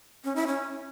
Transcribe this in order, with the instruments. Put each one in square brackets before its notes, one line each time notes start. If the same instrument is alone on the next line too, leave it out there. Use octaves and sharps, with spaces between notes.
[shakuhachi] C#4
E4
C#4